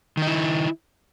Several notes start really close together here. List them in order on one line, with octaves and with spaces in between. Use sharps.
D#3 D#4 E4